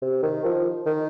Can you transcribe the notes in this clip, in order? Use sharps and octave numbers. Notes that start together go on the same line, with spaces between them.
C3
D#3
F3
D#3